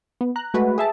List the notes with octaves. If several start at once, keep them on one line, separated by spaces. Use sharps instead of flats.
B3
A#5 F#6
G#3 A3 F#4 B4
G#4 E5 A5